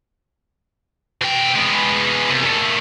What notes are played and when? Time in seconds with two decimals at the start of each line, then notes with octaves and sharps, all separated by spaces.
1.21 B2 G5
1.55 G#3 B3
2.30 C2
2.44 A#2 A3